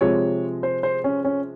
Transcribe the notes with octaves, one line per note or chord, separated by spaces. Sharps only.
C3 F3 G#3 C#5
C5
C5
C#4
C#4